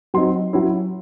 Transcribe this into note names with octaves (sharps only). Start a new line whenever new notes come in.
F#3 C4 D#4 C6
F#3 C#4 E4